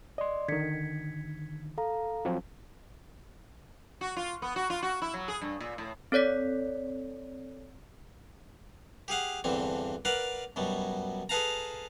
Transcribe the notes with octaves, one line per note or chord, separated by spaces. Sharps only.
D5 D#5 C6
D3 D#3 G#6 B6 C#7
A4 F5 A#5
F3 F#3 C4
F#4
F4
B3
F#4
F4
F#4
E4
F#3
G#4
G2
A#2
A2
C4 A4 C#5 D5 B6
G4 G#4 F5 F#5
E2 G2 D3 E3 C4
A#4 B4 D5 F5 F#5
F#2 B2 F#3 G3
G#4 A4 B4 F5 A5 A#5